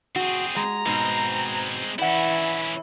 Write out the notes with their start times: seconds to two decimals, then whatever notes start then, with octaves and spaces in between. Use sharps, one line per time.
0.16 C4 F#4 G#4
0.56 G#3 A#5
0.86 G#2 B2 G#3 C4
1.99 E3 C#4 E4 D5 F#5